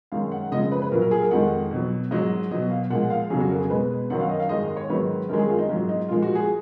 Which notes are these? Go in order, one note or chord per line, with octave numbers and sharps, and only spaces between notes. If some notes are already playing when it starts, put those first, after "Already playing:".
F#2 D#3 G#3 F5
F#5
F#2 C#3 F3 G#3 D#5
D#5
B4
B4
A#2 F#3 A#4
A#4
G#4
A#4
F2 D#3 G#3 F#5
B2 F#3
G#2 F#3 D#5
B2 F#3 D#5
F5
A#2 F3 G#3 F#5
F5
F2 C#3 F#3 G#4
F#4
A#4
G#4
B2 G#3 B4
F#2 D#3 F#3 F#5
F5
D#5
F5
G#2 D#3 G#3 D#5
D#5
C#5
G#2 D#3 F#3 B4
F#2 D#3 G#3 A#4
G#4
F4
D#4
G#2 F#3 F4
D#4
A#2 F3 G#3 F4
F#4
G#4